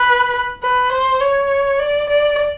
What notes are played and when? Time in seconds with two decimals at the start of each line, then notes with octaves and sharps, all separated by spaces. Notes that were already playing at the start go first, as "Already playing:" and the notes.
Already playing: B4
0.63 B4
0.92 C5
1.21 C#5
1.80 D5
2.09 D5